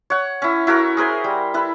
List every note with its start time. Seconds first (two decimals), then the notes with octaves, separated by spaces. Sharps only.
0.10 C#5 F#5
0.42 C#4 E4
0.67 E4 F#4 A4 A#4
0.97 G#4 A#4 C5 G#5
1.24 G3
1.54 E4 A4 B4